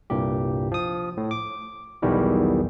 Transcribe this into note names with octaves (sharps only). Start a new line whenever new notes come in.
C2 G2 A#2 G4
F3 D#6
A2
D6
B1 E2 B2 D#3 E3 G3